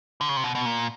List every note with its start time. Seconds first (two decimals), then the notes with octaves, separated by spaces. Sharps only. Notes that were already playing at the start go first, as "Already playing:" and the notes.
0.21 D3
0.29 C#3
0.36 C3
0.44 B2
0.55 B2
0.66 A#2